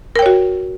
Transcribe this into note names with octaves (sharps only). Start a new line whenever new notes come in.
F#4 A#4 C#5 G5